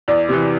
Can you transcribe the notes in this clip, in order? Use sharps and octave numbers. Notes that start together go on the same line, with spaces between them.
E2 D5
C3 E3